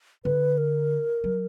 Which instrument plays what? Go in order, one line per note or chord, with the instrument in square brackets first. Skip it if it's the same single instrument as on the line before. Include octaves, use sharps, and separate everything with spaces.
[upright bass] D3 [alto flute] B4
[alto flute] A#4
[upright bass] F#3